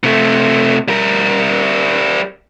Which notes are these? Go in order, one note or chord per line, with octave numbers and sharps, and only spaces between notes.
C3 A3
G3 A#4